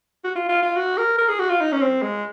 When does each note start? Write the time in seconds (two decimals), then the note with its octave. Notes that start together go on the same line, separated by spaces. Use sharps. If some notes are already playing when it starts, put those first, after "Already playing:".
0.24 F#4
0.36 F4
0.49 F4
0.63 F4
0.76 F#4
0.98 A#4
1.18 A#4
1.29 G#4
1.39 F#4
1.50 F4
1.61 D#4
1.72 C#4
1.81 C4
2.03 G#3